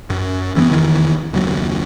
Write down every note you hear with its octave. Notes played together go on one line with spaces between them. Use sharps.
F#2
E1 E3 A#3 B3
F1 E2 D#3 E3
F#1 D#2 F#3